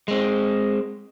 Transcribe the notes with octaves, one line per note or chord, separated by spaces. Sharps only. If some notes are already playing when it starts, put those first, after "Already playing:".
G#3 C4